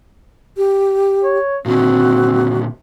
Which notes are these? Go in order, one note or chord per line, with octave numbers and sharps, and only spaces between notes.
G4
C#5
A#2 D3 D#3 C4 F#4